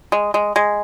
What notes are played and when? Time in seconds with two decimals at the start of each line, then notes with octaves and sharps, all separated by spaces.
0.12 G#3
0.34 G#3
0.56 G#3